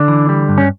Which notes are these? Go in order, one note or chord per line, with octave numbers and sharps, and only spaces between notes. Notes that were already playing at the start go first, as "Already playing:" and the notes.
Already playing: D3 D4
E3
G3
G2
C#4